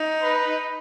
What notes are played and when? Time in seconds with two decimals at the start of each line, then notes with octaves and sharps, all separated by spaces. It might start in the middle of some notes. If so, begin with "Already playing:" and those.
Already playing: D#4
0.23 B4